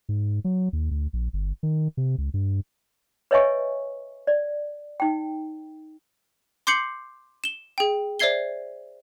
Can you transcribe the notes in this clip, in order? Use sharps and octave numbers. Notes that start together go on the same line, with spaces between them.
G#2
F#3
D#2
D2
A#1
G1
D#3
C3
C#2
G2
B4 C#5 D#5 E5 G#5 C#6
D5
D#4 G5
C6 D6 G6 C7 C#7 F#7
E7 G7
G#4 G5
C5 D5 E5 G#6 C7 G7